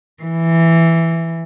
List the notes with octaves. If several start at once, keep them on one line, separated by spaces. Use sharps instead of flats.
E3